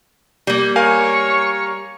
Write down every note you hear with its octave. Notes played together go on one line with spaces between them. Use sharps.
G3 A#3
A#4 C#5 F5 G#5 C#6